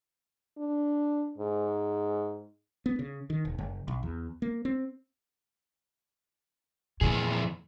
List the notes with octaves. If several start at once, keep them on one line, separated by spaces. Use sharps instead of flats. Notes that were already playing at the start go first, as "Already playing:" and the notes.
D4
G#2
B3
C#3
D#3
E1
F#1
B1
E2
A#3
C4
F2 A#2 E3 G#4